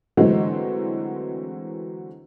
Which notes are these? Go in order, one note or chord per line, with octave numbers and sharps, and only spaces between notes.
D3 E3 F#3 G#3 A3 C4